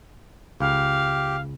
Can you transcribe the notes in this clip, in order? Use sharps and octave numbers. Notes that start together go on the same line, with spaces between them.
C#2 G4 F5